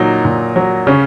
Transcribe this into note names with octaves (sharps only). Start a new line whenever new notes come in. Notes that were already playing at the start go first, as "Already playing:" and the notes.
Already playing: A#2 F#3 D#4
A#2
F#3
C#3 C#4